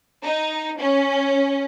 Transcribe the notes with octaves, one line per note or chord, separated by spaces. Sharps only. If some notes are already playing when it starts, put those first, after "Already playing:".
D#4
C#4